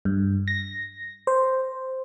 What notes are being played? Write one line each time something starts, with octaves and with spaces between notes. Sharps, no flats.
G2
A#6
C5